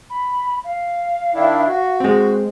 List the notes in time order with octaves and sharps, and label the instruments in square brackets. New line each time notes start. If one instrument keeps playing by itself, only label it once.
[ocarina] B5
F5
[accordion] D#3 D4 E4
F#4
[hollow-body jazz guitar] G#3 C4